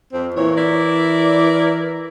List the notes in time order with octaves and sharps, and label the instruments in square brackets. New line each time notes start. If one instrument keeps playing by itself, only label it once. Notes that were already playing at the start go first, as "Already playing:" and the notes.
[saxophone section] F2 [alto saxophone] C4
[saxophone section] A#2 C#5 [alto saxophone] E3
[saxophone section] E4 A#4 D5